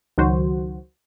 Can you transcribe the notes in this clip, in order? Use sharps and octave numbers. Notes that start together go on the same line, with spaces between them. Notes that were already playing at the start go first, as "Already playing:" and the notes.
C#2 D#3 F#3 F#4 C5